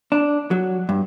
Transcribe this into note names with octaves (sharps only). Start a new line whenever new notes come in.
D4
F#3
G2